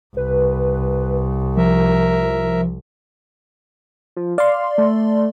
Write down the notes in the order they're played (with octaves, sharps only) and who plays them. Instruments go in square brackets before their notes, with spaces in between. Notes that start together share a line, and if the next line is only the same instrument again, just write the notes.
[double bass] C2 [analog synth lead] B4
[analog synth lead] F3 [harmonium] A#4 E5
[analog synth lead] F3
[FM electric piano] D5 C6 [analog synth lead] F5
[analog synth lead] A3